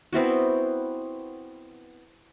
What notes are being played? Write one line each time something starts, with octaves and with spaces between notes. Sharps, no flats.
B3 C4 E4 F#4